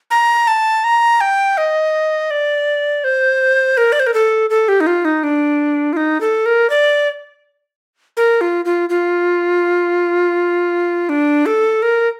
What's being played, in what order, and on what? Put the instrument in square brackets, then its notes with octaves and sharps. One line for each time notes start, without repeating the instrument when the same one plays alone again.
[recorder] A#5
A5
A#5
G5
D#5
D5
C5
A#4
D5
C5
A#4
A4
A4
G4
D#4
F4
D#4
D4
F4
D#4
A4
A#4
D5
A#4
F4
F4
F4
D4
A4
A#4